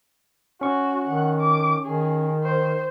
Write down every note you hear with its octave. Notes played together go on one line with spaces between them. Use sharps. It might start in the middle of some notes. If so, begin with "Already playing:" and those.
C#4 F#4 C#6
D#3 F#5
D6
D#3 G#4
C5